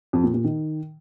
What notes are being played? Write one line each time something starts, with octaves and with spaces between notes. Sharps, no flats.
F2
A#2
A#2
D#3